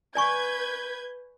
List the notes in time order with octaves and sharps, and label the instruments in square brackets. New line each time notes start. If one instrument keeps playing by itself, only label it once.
[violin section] B4 G6 G#6 [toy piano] D5 G#5 C#6